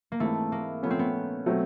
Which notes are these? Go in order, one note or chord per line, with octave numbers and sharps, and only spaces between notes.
A#3
G#2 E3 G#3 A3 C4
A#3
A#2 F3 A3 B3 C#4
C4
B3
B2 F#3 A3 C4